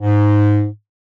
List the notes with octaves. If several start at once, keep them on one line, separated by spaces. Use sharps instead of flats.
G#2